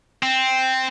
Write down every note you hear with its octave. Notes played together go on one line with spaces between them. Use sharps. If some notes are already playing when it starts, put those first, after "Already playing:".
C4